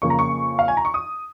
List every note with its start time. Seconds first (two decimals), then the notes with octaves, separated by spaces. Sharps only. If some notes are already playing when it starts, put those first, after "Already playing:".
0.02 F2 C#3 A#3 C#6
0.10 A#5
0.19 C#6
0.59 F5
0.68 G#5
0.77 A#5
0.85 C#6
0.94 D#6